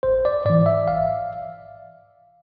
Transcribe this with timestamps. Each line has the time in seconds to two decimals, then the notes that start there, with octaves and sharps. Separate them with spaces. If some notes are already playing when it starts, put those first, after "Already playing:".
0.03 A1 C5
0.25 D5
0.45 G#2 E3 D5
0.66 E5
0.88 A1 F5